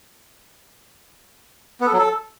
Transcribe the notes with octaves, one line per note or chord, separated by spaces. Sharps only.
B3
A4
F#3
A4